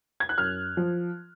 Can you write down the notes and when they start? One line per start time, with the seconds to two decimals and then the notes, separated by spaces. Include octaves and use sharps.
0.20 G#6
0.29 F#6
0.38 F#2 F6
0.77 F3